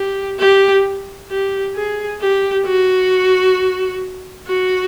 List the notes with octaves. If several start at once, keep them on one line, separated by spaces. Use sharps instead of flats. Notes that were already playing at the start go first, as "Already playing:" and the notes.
Already playing: G4
G4
G4
G#4
G4
F#4
F#4